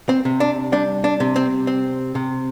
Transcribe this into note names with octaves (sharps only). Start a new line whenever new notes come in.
C4
C3
D4
G3 D4
D4
C3
C4
C4
C3